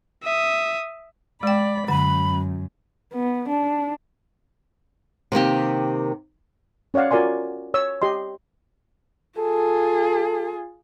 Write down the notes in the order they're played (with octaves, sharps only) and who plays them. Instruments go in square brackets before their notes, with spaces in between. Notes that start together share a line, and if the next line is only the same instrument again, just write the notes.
[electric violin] E5 D#6
[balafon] G#3 G5 [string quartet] D5 B5
[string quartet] F#2 [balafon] D3 F#5 [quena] B5
[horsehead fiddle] B3
D4
[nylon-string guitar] C3 D#3 A#3 G4
[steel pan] C#4 C#5 D5 F5 F#5
F4 F#4 A#4 D5 G#5 C6
C#5 E6
G4 D#5 C6
[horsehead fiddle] F4 G#4 [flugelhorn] A4